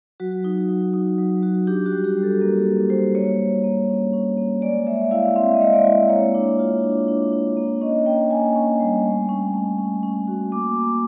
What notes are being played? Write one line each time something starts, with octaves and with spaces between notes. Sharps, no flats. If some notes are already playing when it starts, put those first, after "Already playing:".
F#3 F#4
D#4
F#3
D#4
F#3
F#4
D4 G4
F#4
G3
G4
G3
A4
A#3 A#4
D4
G3 C5
A#3 C#5
A#3
A#3
C#4
C#4
A#3
G#3 D5
G#3 E5
E4 F5
C4 E5
D#5
G#3
D5
E4
D5
A#3 C#5
D4
F4
D4
D4
D4
A#3
C#4 D#5
A#3 G5
A#3 G#5
C#4
G3
A3
C#4
A3
C#4
C#4
F#4
A#3 D6
A#3